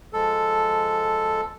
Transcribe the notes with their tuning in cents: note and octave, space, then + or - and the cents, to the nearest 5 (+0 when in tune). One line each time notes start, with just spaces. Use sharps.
F3 +0 G#3 +0 A4 +0